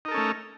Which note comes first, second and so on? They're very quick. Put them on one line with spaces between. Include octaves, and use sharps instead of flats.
D#4 A#4 A4 C#4 A3